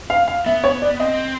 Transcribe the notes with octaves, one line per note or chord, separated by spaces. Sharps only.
F5
F5
B3 E5
C#5
D5
C4 D#5